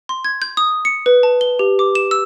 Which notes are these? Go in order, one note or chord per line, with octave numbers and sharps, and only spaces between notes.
C6
G#6
G6
D#6
C#7
B4
A5
G7
G4
D6
E7
E6